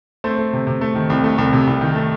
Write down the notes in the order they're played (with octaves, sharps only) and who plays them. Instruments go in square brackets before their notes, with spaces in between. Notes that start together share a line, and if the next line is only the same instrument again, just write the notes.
[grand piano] A3 C4 C5
A3
C3
C3
A3
D#3
C2
A3
C2
C3
C2
D#3
A3